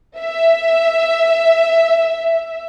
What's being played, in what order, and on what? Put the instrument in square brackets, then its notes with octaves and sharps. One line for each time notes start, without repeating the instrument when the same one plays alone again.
[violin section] E5